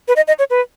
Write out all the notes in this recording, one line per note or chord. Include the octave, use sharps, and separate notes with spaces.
B4
D#5
D#5
C#5
B4